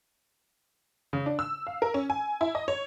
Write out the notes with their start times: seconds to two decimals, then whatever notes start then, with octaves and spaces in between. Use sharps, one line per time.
1.13 C#3
1.26 D4
1.39 E6
1.67 F5
1.82 A#4
1.94 C#4
2.10 G#5
2.41 E4
2.55 D#5
2.68 C#5